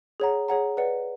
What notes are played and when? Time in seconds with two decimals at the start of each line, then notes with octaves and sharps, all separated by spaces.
0.20 G#4 C#5 F#5 A#5
0.48 G#4 C#5 F#5 A#5
0.77 B4 D5 F#5